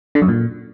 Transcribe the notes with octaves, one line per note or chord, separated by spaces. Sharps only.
D3
F#2
A#2